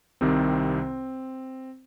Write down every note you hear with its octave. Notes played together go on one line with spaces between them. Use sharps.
C2 C3 D#3 C4